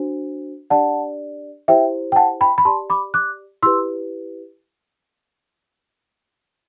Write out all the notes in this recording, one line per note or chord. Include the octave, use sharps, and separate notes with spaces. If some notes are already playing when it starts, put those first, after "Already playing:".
Already playing: D4 F#4 C5
D4 G4 D5 F#5 A5
E4 G4 C5 E5 G5
G5
F#5 A5
G5 B5
B5
G4 D5 A5 C6
B5 D6
D6 F#6
E4 G4 B4 C6 E6